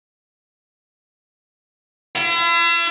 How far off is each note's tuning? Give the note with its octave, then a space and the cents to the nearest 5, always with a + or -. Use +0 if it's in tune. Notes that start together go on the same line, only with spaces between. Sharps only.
E4 +45